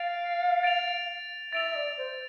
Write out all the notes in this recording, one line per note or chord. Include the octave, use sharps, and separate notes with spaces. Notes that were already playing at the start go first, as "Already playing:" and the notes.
Already playing: F5 A6 D7 F7
A6 D7 F7
E5 A6 D7 F7
E5
D5
C5